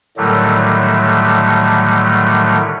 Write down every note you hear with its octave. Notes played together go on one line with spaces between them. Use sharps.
A2 D3 D#3 F#3 G3 A3